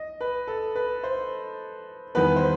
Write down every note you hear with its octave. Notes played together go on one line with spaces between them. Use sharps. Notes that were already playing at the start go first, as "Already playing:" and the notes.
Already playing: D#5
B4
A4
B4
C5
E2 D#3 G3 B3 B4
C5